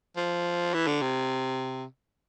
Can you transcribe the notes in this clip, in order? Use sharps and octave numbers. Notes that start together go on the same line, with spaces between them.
F3
E3
D3
C3